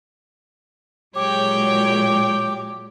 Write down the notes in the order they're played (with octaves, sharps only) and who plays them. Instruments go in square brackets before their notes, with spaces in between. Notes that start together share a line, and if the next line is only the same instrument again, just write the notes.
[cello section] A#2 F#3 G#3 [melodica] G4 [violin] C#5 G5